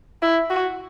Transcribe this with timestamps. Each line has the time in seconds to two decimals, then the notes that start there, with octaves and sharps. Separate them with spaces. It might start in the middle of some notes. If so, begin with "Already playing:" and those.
0.22 E4
0.50 F#4